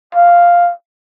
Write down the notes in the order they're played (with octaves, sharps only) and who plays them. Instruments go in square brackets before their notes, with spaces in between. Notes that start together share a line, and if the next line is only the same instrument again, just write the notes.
[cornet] F5